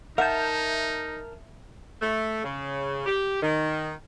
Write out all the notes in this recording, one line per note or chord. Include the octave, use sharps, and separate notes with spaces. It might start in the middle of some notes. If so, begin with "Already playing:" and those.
D#4 A#4 E5 F#5 A5 G6
A3
C#3
G4
D#3